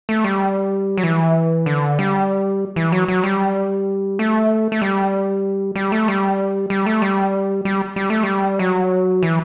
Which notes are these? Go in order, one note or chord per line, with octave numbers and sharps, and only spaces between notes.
A3
G3
F#3
E3
D3
G3
E3
F#3
F#3
G3
A3
A3
G3
G3
A3
G3
G3
A3
G3
G3
G3
A3
G3
F#3
E3